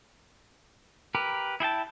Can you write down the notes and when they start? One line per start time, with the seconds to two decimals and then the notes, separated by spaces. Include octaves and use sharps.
1.15 G4 A#4 B4
1.60 E4 G#4 G5 A5